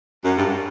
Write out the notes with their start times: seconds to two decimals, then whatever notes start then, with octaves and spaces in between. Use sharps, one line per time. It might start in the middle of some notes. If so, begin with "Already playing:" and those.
0.25 F#2
0.38 G2